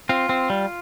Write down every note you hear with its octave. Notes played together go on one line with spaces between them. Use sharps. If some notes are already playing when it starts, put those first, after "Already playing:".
C4 F4
C4
G3